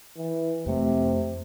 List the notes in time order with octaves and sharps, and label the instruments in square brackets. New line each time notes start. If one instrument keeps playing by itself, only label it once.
[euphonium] E3
[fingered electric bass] F2 A3 [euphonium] C3